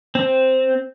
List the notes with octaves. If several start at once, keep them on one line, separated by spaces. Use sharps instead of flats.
C4